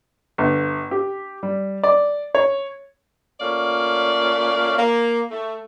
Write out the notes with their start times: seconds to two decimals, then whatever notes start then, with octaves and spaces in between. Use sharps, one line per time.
0.38 G1
0.91 G4
1.43 G3
1.83 D5
2.35 C#5
3.40 A#2 A3 C#4 D5 F5
4.77 A#3
5.31 A3